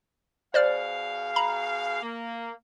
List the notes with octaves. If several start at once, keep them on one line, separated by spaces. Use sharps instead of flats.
B2 G#4 C5 D5 F5 F6
A#5 B5
A#3